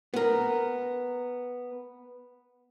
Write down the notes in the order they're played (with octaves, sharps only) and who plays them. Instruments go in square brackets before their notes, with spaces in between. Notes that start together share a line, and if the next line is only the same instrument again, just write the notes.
[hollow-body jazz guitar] B3 A#4